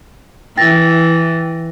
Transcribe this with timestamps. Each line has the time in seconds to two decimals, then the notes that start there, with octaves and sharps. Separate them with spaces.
0.57 E3 G5 A6 A#6